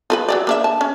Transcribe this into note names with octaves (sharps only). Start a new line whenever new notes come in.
F4 A4 B4
F#3 G3 D5
A#3 D4 E5
A5
C#4